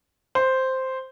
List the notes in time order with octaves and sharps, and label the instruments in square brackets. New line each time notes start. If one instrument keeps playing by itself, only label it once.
[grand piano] C5